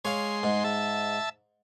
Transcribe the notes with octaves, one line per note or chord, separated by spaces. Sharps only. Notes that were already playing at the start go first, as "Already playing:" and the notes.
G#3 C#5 F5 C6
G#2
E5 A5